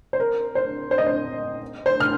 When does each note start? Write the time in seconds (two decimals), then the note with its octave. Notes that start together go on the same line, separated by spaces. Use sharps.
0.13 C5
0.20 A#4
0.55 C5
0.91 C5
0.98 D#5
1.07 C5
1.86 C5
2.00 F6